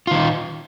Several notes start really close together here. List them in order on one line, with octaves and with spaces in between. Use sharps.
F4 D#3 D#4